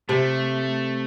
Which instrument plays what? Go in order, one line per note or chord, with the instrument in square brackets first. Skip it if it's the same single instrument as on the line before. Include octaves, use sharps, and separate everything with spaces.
[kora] C3 [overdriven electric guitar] A3